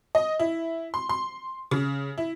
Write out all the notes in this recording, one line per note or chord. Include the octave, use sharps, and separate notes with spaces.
D#5
E4
C6
C6
C#3
E4